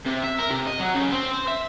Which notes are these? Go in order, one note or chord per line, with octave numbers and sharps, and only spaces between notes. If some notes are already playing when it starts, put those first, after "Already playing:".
C3
E5
A#4
C3
D#5
F#3
C#3
C4
C5
E5